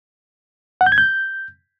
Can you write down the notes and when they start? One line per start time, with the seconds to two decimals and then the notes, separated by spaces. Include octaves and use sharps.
0.81 F#5
0.86 G6
0.92 G#6
0.98 G6